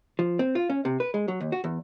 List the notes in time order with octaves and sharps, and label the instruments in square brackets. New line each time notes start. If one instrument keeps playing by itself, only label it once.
[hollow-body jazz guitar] F3
C4
F4
C#4
C3
B4
G#3
F#3
D#2
F#4
E2